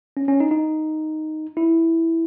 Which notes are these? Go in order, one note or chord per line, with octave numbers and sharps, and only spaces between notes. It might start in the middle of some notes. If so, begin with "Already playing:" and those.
C#4
C#4
D#4
D#4
E4